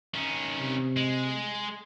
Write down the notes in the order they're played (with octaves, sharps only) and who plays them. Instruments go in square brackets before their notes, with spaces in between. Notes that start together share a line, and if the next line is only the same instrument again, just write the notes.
[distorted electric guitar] D#3 C#4
[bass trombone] C3
[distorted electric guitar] G#3